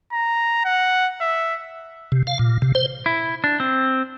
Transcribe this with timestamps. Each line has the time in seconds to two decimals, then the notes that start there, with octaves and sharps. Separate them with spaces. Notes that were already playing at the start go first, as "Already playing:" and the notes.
0.12 A#5
0.65 F#5
1.21 E5
2.12 C3
2.27 F5
2.39 A#2
2.62 C3
2.75 C5
3.06 E4
3.44 D4
3.60 C4